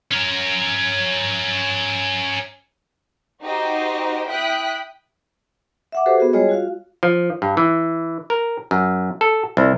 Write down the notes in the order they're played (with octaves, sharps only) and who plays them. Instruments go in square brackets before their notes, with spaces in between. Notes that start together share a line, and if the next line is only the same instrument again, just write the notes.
[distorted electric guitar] C#4 A#4
[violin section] D#4 F#4 G4 C5 D#5
E4 G5 D#6 F#6 B6
[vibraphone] E5 F#5 D6
F#4 G4 A4 B4 C5
B3 F#4 G#4
G3 G#3 F4 G#4 C#5 D#5
F4 F#4 F5
[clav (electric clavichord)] F3
G2
E3
A#4
F#2
A4
C2